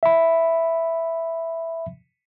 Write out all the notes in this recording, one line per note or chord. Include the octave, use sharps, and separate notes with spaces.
E5 B5